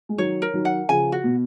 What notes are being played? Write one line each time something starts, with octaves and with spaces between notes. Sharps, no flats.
G#3
D#3 F#3 C#5
A#4
D#3 F#3
F#5
C#3 F3 G#5
F#4
B2